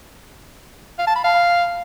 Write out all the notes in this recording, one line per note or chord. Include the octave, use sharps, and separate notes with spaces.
F5
A5
B5
F5